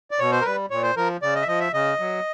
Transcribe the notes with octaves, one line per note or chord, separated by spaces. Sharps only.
D5
B2 C#5
C5
A#4
G3 B4
A#2 C#5
C5
F3 A#4
C#3 D5
D#5
E5
F3 D#5
E5
C#3 D#5
F#3